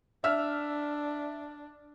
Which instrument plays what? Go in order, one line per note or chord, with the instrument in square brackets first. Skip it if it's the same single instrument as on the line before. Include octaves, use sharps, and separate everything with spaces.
[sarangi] D4 [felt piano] E5 E6 F6